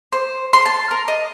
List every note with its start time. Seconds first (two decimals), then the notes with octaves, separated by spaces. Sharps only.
0.13 C5
0.53 C6
0.66 A5
0.91 A#4
1.08 D#5